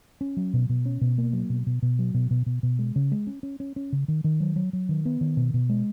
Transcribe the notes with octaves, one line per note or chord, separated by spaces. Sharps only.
C#4
F#3
B2
B2
C#4
B2
A#3
F#3
B2
B2
B2
F#3
B2
B2
B2
B2
G#3
C#3
G#3
C#4
C#4
C#4
C#4
C#3
D#3
D#3
F#3
F#3
F#3
D#3
B3
D#3
B2
B2
G#3